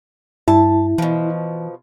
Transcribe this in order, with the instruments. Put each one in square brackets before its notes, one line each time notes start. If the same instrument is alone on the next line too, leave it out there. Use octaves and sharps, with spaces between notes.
[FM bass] G2 [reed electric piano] E4 [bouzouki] A5
[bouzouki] B2 F3 [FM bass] E3